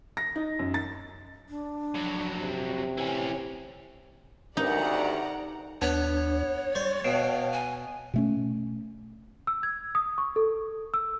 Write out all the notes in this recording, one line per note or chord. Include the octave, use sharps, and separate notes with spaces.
A#6
D#4
F#2
A6
D4
F2 F#3
C3
E3 C#4 G#5
D2 G2 D#4 D5 F#5 A#5
D#2 B3 D4 C#5
G3 C5 C#6 A6
B2 F5 G5 A5
G#5
B2 A3 C#4
E6
G#6
D#6
C#6
A4
E6